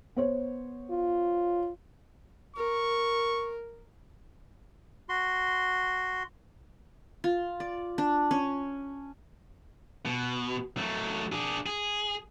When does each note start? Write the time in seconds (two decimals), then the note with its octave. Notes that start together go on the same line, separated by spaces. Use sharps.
0.16 B3 C5 C#5
0.91 F4
2.57 A#4 C#6
5.09 F#4 C6
7.24 F4
7.60 D5
7.98 D4
8.31 C#4
10.06 B2
10.77 F#3 A3
11.32 D4 G#4
11.66 G#4